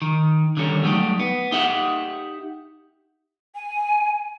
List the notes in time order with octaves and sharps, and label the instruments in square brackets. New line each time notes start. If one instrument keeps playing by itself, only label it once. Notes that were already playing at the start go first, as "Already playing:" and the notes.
[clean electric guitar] D#3
D3 D#3 G3 C#4
F#3 G3 A3 C4 D#4 G4
B3
D#4 G4 E5 F#5
[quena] G#5